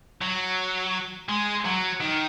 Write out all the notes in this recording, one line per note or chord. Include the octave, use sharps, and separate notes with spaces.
F#3
G#3
F#3
D#3